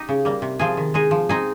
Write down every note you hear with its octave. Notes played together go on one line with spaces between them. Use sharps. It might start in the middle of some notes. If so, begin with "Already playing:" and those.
Already playing: D#4 G4
C#3
G3 A#3
C3
F3 C4 F4 G#4
D#3
G#3 D#4 G#4
F3
C4 D#4 G#4